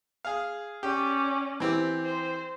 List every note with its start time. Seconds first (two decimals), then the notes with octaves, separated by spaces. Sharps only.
0.25 G#4 F5
0.83 C#4 G4 D5
1.60 E3 C4 G4
2.05 C5